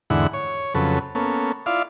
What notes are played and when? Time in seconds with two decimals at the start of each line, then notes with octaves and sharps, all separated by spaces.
0.10 E2 G#2 D3 E4 F#5
0.34 C#5
0.75 F2 C#3 F#3 A4 B4
1.15 A#3 B3 C#4 A4
1.66 E4 F4 D5 F5